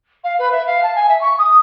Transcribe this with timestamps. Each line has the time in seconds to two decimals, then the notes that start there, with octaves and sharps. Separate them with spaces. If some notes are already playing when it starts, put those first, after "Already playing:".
0.24 F5
0.39 B4
0.52 E5
0.66 F5
0.83 A5
0.96 G#5
1.09 E5
1.21 C#6
1.39 D#6